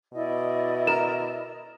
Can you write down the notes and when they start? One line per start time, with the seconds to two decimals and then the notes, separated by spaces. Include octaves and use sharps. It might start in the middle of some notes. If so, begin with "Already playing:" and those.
0.13 B2 E4 D5 D#5
0.87 A#4 E7